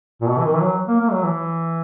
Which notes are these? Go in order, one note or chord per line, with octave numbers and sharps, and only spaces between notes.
A#2
B2
E3
D#3
E3
F#3
A#3
A#3
F#3
E3